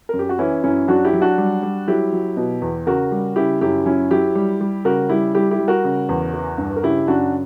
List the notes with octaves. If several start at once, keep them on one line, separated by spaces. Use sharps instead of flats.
F#2 A#4
G4
F#4
E3 C#4 E4
F#2 C#4 E4
F#3 D4 F#4
E4 G4
F#3
D4 F#4
G3
G3
F#3 E4 G4
F#3
B2
E2
C#3 F#4 A#4
G3
C#3 E4 G4
F#2 E4 G4
F#3 C#4 E4
F#3 E4 G4
G3
G3
C#3 F#4 A#4
G3 E4 G4
G3 E4 G4
E4 G4
G3
F#4 A#4
C#3
E2
E3
G2
A#4
C#3 E4 G4
F#2 D4 F#4